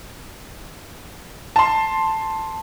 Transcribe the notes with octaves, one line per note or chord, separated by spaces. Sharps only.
A5 C6